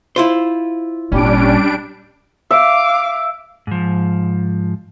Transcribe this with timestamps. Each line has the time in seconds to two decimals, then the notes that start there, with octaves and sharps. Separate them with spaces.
0.16 E4 F4 C5
1.12 G#1 A#2 G3 C#4 D4 D7
2.51 E5 F5 D6
3.67 G#2 F3